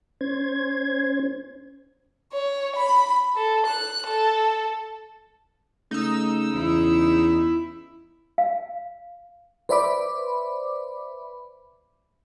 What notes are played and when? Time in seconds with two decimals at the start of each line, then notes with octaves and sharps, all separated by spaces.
0.21 C#4 C5 G#6
2.32 C#5
2.76 B5
3.35 A4
3.66 F#6
4.07 A4
5.91 C#3 A3 D#4 E6
6.53 E2 E4
8.38 F5
9.69 B4 C5 D5 E5 B5 D6